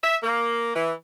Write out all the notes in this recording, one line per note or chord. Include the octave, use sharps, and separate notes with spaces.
E5
A#3
E3